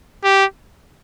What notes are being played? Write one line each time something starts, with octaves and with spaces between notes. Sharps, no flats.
G4